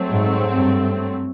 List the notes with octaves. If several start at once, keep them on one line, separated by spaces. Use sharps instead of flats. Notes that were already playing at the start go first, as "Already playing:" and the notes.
Already playing: F#3 A3 C4
G#2
G2